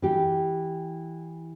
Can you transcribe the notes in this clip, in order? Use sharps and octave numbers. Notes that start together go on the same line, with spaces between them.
E3 G4